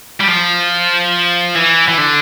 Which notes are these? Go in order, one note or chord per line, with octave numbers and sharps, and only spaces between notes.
G3
F3
E3
E3
D3